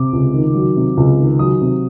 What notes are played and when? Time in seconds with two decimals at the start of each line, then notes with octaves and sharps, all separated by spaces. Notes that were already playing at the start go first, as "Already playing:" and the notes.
Already playing: C3 D6
0.13 C#2
0.34 D#3
0.54 F#3
0.76 C3
0.97 C#2
1.18 D#3
1.39 F#3 D#6
1.61 C3